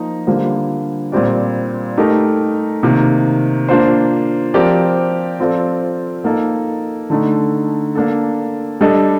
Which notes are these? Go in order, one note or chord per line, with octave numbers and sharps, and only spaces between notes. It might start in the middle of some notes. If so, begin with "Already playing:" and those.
Already playing: F3 A#3 D#4
D3 G3 A#3 F4 C5
A#2 G3 C4 G4 D5
A3 D#4 G4 A#4
C3 D#3 A#3
A#3 D4 F4 C5
F3 C4 G4 A#4 D5
F3 C4 F4 A4 D5
A#3 D#4 A4
D3 A3 D#4
A#3 D4 A4
G3 D4 A4 D#5